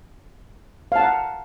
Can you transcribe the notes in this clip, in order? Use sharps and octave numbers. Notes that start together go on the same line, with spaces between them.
F5 F#5 A5 A#5